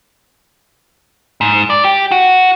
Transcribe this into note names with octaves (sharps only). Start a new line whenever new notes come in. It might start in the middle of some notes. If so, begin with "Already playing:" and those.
G#2
D5
G4
F#4